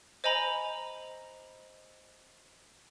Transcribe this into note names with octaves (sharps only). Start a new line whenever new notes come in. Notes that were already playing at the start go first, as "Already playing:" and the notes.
C5 D#5 G#5 A#5 B5